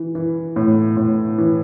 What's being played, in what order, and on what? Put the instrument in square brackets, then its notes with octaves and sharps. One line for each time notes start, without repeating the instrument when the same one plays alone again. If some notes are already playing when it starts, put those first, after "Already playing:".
Already playing: [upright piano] E3
E3
A2
A2
E3